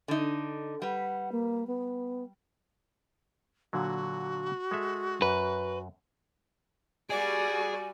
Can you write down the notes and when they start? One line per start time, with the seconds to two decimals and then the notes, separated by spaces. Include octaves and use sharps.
0.08 D3 D#4
0.82 G3 B4 F#5
1.32 A#3
1.67 B3
3.73 A#2 D3 F#3 F#4
4.71 G#3 A4 E5
5.22 F#2 B4
7.10 G3 F#4 G#4 D5 G#5